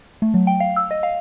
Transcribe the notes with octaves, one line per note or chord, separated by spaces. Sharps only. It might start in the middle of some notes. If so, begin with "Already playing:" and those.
A3
F#3
G5
F5
E6
D#5
F5